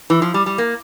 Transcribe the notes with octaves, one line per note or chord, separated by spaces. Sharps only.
E3
F3
G3
G3
A#3